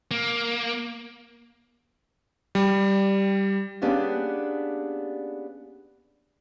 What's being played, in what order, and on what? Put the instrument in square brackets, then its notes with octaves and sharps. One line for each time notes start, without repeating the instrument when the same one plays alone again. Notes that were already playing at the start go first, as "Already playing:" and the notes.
[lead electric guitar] A#3
[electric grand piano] G3
[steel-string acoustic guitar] A#3 B3 C#4 D4 G4 G#4